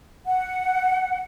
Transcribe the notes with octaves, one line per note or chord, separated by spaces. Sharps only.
F#5